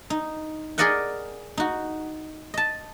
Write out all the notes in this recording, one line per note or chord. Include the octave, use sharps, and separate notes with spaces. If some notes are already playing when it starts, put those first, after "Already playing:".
D#4
G#4 A#4 D5 D#5 F#5 G5
D#4 F#4
D#5 A5